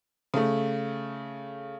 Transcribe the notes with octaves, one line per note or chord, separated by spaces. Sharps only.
C#3 A3